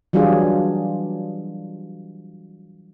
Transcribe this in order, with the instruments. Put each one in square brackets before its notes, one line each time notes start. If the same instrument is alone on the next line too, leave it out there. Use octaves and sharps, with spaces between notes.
[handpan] E3 F#3 G3 D4 F4 G#4